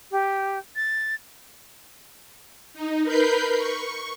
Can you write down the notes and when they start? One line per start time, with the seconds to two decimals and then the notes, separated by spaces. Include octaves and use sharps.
0.11 G4
0.76 A6
2.74 D#4
3.03 A#4 B4 B5 G6 C7
3.57 C#6